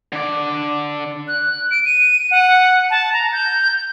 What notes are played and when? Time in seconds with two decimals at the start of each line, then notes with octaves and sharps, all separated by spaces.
0.12 D3 D5
1.28 F#6
1.71 D7
1.85 D#7
2.31 F#5
2.90 A5
3.13 A#5
3.32 G6